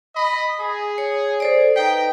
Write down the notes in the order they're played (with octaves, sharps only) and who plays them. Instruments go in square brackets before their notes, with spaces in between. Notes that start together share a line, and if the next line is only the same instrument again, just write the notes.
[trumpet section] D#5 B5
G#4
[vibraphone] C#5
A4 C5 D5
[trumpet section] D#4 G5 [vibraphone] B4